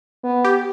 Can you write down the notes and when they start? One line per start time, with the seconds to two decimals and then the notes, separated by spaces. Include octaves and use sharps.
0.24 B3
0.44 G4